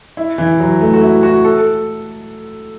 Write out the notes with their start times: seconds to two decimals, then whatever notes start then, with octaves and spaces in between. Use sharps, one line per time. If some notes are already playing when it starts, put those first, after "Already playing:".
0.17 E4
0.38 E3
0.60 F#3
0.81 A3
0.94 F#4
1.01 E4
1.23 F#4
1.45 A4